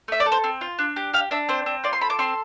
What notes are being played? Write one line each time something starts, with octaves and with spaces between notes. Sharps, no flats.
A3 E5
D5
A4
C5
C4
F4
D4
G4
G4 F5
D4 E5
C4 C5
C4
F4 D5
C6
A4 B5
D6
C4 C6